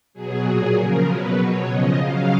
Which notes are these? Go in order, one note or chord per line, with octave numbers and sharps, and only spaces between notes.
B2 F#3 G#4
A#2 F#3 G#4
C#3 F3 A#4
B2 F#3 B4
B2 F#3 C#5
C#3 F3 D#5
C#3 F#3 F5